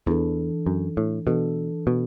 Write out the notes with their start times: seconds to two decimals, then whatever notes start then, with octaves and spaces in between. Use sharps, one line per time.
0.06 E2 E3 D4 A4
0.66 F#2
0.97 A2
1.27 B2 E3 D4 A4
1.87 B2